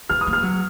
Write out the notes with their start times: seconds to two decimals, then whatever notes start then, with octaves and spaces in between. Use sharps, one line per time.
0.09 A#3 F6
0.21 D#6
0.27 A#3
0.33 F6
0.43 F#3